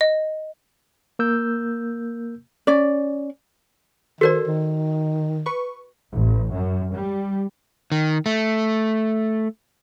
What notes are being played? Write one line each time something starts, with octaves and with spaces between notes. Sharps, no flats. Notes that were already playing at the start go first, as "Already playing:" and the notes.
D#5
A#3 A#4 E6 G6
C#4 D5
D#3 F#4 A4 A#4 C5 D5
D#3
B4 C#6
A1
F#2
G3
D#3
A3